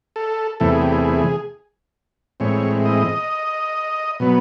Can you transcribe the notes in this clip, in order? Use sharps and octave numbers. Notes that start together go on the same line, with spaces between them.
A4
E2 C3 E3 A3 A4
G#4
G4
G#4
G#4
A2 E3 G#3 C4 C#5
D#5
B2 F#3 B3